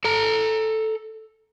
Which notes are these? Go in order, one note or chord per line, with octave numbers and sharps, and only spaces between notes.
A4 A#5